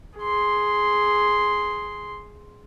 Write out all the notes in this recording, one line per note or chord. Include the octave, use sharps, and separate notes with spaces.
G#4 C6